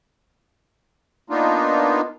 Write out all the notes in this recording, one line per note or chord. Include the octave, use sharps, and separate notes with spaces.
A#3 B3 D4 D#4 F4